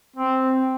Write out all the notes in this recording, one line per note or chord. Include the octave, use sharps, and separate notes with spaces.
C4